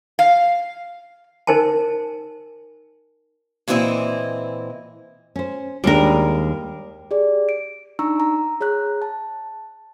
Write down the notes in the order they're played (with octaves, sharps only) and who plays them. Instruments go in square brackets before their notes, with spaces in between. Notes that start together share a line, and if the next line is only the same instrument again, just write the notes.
[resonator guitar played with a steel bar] F5
[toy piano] D#4 A#4 C5 G#5 A5
[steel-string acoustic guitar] A#2 E3 C4 E4 D#5
[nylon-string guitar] C#4 C5
[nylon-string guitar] D#2 G#3 D4 [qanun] G3 A#4
[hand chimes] G4 G#4 D5
D7
D4 D#4 A#5 C#6 E6
A#5
G#4 C#5 A#5 F#6
A5